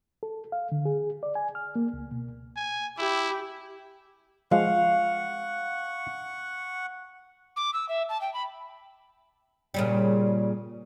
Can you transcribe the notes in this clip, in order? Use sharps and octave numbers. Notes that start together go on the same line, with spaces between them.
A4
F5
D3
G#4
D5
G#5
F6
A#3
C#2
B2
G#5
E4 G4
F3 G#3 F5 F#5 C#6
D6
E6
E5
A5
G5
B5
A#2 C#3 G3